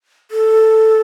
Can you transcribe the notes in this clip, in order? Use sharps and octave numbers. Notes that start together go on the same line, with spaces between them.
A4